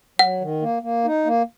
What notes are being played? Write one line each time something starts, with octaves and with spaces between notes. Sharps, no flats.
F#3 F#5
D#3
A#3
A#3
D#4
A#3